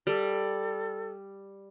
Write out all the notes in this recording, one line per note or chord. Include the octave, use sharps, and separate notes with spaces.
G3 A4